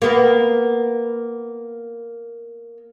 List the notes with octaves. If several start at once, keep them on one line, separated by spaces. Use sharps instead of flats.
A#3 B3